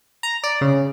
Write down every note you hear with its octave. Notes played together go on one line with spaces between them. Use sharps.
A#5
D5
C#3